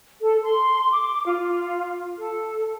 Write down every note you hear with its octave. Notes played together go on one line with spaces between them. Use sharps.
A4
C6
D6
F4
A4